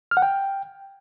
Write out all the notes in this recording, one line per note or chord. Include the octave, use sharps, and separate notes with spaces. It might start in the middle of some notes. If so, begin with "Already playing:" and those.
F6
F#5
G5